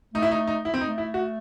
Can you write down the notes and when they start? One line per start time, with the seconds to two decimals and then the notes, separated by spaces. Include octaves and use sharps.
0.14 A3 D#4
0.22 E4
0.31 D#4
0.47 D#4
0.65 E4
0.74 C4
0.81 A3 D#4
0.98 E4
1.14 F#4